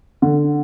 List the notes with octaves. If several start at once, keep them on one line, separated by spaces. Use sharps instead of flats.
D3